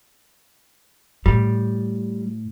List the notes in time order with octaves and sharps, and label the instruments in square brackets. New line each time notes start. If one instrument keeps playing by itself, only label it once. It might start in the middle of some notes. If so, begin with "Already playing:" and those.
[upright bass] A2 [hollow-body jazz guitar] G3